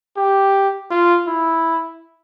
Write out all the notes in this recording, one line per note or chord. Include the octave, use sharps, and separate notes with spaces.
G4
F4
E4